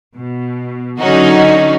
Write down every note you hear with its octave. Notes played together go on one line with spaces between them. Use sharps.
B2
D3 F#3 C#4 D#4 F#4